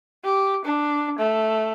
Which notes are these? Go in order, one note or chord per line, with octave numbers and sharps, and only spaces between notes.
G4
D4
A3